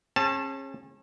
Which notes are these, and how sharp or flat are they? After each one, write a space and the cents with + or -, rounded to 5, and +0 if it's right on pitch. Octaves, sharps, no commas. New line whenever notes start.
C#4 -35 G#4 -20 A5 +0